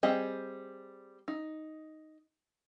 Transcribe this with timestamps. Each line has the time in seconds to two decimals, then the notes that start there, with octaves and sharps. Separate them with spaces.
0.03 G3 C4 G#4 D#5
1.28 D#4